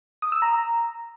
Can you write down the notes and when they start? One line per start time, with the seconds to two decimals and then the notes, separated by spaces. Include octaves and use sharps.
0.22 D#6
0.32 E6
0.42 A#5